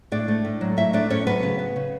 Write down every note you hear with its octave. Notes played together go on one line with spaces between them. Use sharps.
A2 D4 D5
A3
A2
F#3
A2 E4 E5
A3 D4 D5
A2 C#4 C#5
F#3 B3 B4
C#3
B3
C#3